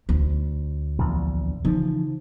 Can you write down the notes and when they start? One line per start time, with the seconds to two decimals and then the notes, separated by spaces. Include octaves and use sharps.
0.09 D2
0.98 A#1 E2
1.65 C#3 E3 F3 D#4